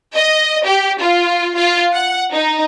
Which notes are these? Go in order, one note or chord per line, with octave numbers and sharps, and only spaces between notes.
D#5
G4
F4
F4
F#5
D#4